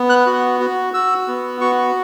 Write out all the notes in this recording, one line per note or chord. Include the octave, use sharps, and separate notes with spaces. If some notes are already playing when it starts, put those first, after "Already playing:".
Already playing: B3
F#6
F#4
F#4
F#4 E6
B3
F#4 C#6